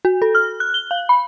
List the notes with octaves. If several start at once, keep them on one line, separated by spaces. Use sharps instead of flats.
F#4
A4
F6
F#6
G7
F5
B5